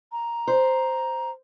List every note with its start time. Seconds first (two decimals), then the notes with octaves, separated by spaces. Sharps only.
0.12 A#5
0.47 C5